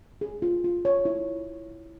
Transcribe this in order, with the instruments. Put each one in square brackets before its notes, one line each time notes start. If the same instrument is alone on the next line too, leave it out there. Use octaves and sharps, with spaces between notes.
[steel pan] G#4
F4
F4
C#5
E4